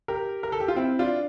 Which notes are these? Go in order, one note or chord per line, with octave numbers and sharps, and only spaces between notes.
G4 A#4
A#4
A4
G4
F4
C4 E4
D4 F4